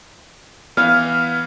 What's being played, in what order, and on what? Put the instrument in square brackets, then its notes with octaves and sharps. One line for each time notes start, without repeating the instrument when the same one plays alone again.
[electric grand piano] E3 B3 [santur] F5